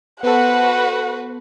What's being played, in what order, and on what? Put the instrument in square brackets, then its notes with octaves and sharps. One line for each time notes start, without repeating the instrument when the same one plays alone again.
[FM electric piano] B3 A4 [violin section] F#4 B4 C5 [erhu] F#5